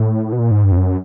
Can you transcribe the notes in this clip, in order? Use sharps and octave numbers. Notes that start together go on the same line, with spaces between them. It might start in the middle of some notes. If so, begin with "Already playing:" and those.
Already playing: A2
B2
A#2
G#2
G2
F2
F#2